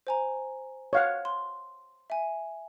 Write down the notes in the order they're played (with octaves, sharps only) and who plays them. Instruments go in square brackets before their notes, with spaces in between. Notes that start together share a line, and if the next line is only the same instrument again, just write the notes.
[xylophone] C5 G#5 A#5
[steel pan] C#5 F5 F#5
[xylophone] C6
E5 G#5